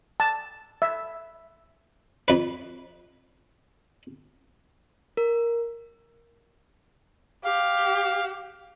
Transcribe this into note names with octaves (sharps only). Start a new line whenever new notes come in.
A5
E5
F2 B4
A#4
G4 F5